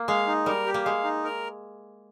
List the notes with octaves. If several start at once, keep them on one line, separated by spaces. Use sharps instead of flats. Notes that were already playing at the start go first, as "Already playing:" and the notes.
Already playing: A#3
G#3 F5
D#4
G3 A#4
G4
A#3
G#3 F5
D#4
A#4